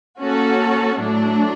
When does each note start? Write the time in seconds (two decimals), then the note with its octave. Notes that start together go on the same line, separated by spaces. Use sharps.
0.20 A#3 C#4 F#4 A4
0.99 A2 F#3 A3 D4